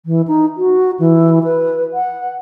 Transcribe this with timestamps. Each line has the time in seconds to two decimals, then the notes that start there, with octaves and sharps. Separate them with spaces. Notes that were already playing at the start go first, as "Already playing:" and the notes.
0.06 E3
0.28 D#4
0.57 F#4
0.99 E3
1.44 B4
1.94 F#5